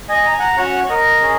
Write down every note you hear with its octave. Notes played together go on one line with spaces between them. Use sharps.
D#5 G#5
A#5
G#5
F#5 A#5
C#4 F#4 C#5 F#5
C#5
A#4 D#5
C#4 G#4